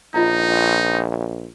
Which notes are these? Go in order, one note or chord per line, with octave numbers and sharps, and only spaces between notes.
A#1 D#4 F4 D#5 A#5